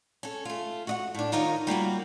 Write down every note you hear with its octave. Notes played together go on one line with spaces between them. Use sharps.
C#4 A4
A3 F4
F#4 D#5 F#5
A2 D4
D#3 D#4 F4 A#4 C#5
G3 A#3 F4 F#4